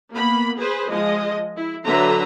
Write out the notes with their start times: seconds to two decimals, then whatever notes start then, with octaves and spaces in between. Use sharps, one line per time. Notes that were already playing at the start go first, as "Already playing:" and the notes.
0.12 A#3 B3 B5
0.56 G#4 B4 C5
0.89 F3 G#3 D#5
1.56 E4
1.85 D3 F#3 B4 E5 A#5 C6